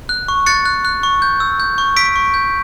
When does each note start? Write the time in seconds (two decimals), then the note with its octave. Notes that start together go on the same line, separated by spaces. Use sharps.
0.09 F#6
0.28 C#6
0.46 F#6 A6 C#7
0.65 F#6
0.85 F#6
1.03 C#6
1.22 G6
1.40 E6
1.60 G6
1.78 C#6
1.96 E6 B6 D7
2.16 C#6
2.34 G6